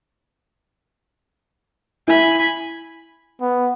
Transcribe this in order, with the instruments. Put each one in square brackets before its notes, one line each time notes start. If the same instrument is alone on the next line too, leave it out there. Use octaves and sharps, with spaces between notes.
[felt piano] E4 [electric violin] G#5 B5
[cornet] B3